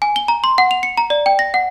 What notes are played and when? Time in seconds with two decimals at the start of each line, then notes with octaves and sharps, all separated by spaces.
0.02 G#5
0.16 G7
0.28 A#5
0.44 C6
0.58 F#5
0.71 F7
0.83 C#7
0.97 A#5
1.10 D5
1.26 G5
1.39 A#6
1.54 F#5